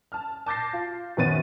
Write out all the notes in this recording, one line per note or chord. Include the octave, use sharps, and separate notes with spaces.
A5 F6
A5 D6 G6 A6 A#6 C7
F4
F#2 D#3 B3 C#5 A6 D#7